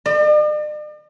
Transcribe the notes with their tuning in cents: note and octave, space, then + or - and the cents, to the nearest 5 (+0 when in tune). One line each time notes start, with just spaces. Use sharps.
D5 +45